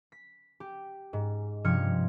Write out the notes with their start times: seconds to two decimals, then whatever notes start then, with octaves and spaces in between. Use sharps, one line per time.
0.12 B6
0.60 G4
1.13 G#2
1.64 G2 C3 F3 F6 G#6 C#7